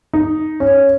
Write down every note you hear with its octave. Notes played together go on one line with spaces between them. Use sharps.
D#4
C#4